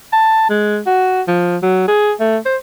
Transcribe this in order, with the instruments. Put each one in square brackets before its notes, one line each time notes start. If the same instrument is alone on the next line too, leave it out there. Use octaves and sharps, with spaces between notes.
[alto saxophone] A5
G#3
F#4
F3
F#3
G#4
A3
C5